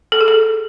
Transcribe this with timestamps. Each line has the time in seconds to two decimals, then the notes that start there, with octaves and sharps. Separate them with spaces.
0.12 A4
0.21 G#4
0.28 A4